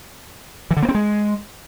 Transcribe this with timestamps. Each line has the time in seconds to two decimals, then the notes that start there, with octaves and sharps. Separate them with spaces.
0.71 E3
0.77 D3
0.83 A#3
0.89 C4
0.95 G#3